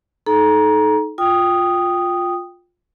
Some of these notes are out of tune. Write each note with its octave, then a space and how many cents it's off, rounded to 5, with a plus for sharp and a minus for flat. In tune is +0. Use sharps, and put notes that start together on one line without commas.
D#4 +0 A4 -35 A#5 +20
F4 +15 G5 +0 D#6 -5